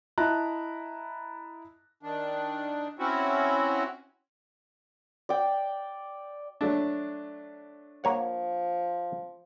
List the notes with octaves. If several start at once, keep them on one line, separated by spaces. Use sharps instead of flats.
E4 D#5 A5 A#5 F#6
D#3 D4
C4 C#4 E4 F#4
D5 G5
F#3 A3 D4
F3 A#3 C#5 F#5